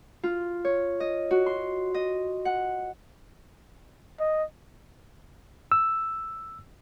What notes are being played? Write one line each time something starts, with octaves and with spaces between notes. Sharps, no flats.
F4
C#5
D#5
F#4
C6
D#5
F#5
D#5
E6